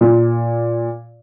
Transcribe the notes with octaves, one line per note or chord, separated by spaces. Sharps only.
A#2